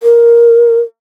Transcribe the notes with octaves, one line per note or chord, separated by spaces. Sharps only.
A#4